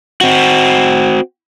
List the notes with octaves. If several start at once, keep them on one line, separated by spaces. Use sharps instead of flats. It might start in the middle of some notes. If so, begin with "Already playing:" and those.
C4 F#4